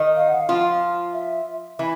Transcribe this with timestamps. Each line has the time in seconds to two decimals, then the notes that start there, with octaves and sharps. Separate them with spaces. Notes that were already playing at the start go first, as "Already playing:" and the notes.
Already playing: D#3 D#4
0.16 F5
0.28 F#5
0.41 F5
0.49 F3 F4
1.13 E5
1.79 E3 E4